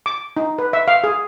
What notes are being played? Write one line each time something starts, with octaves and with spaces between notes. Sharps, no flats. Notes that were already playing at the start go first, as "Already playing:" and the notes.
D6
D#4
B4
E5
F5
G#4